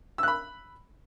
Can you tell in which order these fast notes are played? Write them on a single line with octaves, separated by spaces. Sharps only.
E6 F#6 B5